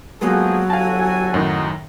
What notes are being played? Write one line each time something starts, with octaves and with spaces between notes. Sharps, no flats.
D2 F3 F#3 G#3 A#3 B3 G#4
G1 A4 F5 G#5 A5
F#2 A2 D#3 D#4